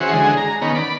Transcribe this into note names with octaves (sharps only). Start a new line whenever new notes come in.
E3 C#4 F#4 G#4 C5
D3 G#3 G#4
A#5
D#3 B3 C#4
D5 B5